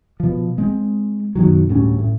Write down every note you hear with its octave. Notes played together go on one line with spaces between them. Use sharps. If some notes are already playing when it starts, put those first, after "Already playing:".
B2 F3
G#3 C4
F#2 B2 D#3 F#3
D2 A2 G3 C#4
A2